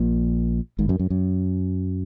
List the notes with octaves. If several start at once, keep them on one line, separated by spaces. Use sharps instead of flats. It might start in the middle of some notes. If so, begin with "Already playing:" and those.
Already playing: A#1 A#2
G#1 G#2
F#2
F#2
F#2